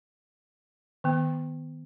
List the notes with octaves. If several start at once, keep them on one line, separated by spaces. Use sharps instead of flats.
D#3 B3